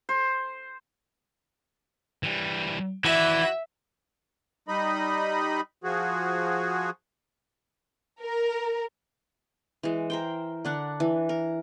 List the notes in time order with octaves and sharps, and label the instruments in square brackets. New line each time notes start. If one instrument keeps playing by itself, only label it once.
[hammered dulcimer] C5
[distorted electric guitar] E3 G3
[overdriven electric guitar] E3 [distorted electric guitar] F#4 D5 [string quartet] E5
[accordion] G3 D#4 D#5 B5
F3 F#4 G#4
[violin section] A#4
[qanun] E3 G#3
A#4 C5 G5
D3 D4 F#5
E3
A#4